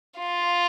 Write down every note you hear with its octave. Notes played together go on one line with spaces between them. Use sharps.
F4